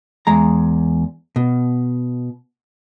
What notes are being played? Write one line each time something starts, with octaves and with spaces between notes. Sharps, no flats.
E2 G#3 A#5
B2